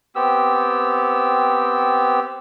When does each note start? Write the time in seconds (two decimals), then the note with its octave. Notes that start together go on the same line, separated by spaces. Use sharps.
0.15 B3 C4 G4 E6